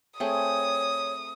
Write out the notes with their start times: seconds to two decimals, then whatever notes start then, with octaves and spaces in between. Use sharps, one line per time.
0.20 A3 C4 G#4 C#5 D#6